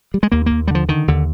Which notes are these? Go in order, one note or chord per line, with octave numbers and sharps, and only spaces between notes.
G3
G#3
D#2 A#3
D#2 A#3
G3
D3 F3
D3 D#3
D#2 D3